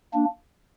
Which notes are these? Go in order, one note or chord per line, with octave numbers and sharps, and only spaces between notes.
A#3 D4